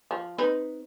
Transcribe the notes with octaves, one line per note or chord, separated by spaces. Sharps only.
F3
C4 D#4 B4